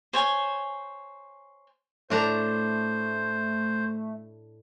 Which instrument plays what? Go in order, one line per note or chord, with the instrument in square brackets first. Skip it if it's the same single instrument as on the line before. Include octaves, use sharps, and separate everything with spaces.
[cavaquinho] C5 C#5 G#5
[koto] A2 D4 A#5 [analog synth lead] A3 [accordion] C5